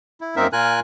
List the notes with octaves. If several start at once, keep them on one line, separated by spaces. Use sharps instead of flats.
E4
F#2 A#3 C4 D#4 A#4 E5
A#2 F4 A#4 G#5 F#6